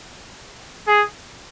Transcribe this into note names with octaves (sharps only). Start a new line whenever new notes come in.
G#4